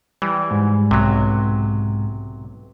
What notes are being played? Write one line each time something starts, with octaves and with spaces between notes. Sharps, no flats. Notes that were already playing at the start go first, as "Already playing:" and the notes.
E3 G3
G#2
B1 C3 F#3